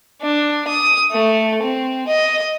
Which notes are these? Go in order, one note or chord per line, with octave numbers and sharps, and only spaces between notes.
D4
D#6
A3
C4
D#5